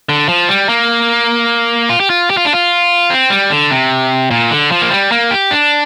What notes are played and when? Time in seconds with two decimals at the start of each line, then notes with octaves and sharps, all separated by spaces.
0.09 D3
0.29 F3
0.49 G3
0.69 A#3
1.89 F4
2.00 G4
2.10 F4
2.30 G4
2.37 F4
2.45 D4
2.53 F4
3.10 C4
3.30 G3
3.50 D3
3.70 C3
4.31 A#2
4.51 D3
4.71 F3
4.82 A#3
4.91 G3
5.12 A#3
5.31 G4
5.51 D4